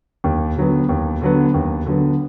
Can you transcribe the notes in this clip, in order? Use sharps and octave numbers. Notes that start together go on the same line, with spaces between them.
D#2
D3 F#3 B3
D#2
D3 F#3 B3
D#2
D3 F#3 B3